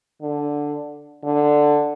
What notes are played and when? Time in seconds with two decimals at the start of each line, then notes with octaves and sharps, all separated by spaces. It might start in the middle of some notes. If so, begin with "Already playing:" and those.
0.22 D3
1.24 D3